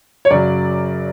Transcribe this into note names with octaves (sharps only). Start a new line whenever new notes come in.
C#5
F#2 C#3 F#3 D5